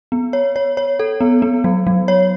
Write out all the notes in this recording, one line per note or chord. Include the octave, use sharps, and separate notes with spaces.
B3
C#5
C#5
C#5
A4
B3
B3
F#3
F#3
C#5